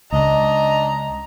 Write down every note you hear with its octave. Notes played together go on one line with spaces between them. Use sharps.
C#2 D4 D#5 A#5